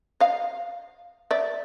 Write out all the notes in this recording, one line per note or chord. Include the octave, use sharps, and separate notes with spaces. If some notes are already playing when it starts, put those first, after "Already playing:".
D#5 F5
D5 E5